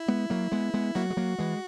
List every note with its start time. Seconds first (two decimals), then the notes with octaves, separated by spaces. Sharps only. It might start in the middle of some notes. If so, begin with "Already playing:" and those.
Already playing: E4
0.08 G#3 B3
0.30 F#3 A#3
0.52 G#3 B3
0.74 G#3 B3
0.95 F#3 A#3 F#4
1.10 G#3
1.17 F#3 A#3
1.38 E3 G#3